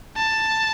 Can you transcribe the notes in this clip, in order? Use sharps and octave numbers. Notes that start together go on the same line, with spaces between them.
A5